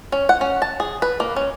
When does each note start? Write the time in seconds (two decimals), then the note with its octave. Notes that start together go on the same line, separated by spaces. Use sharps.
0.12 C#4
0.29 F#5
0.41 C#4
0.62 A5
0.80 G#4
1.02 B4
1.20 A#3
1.36 C#4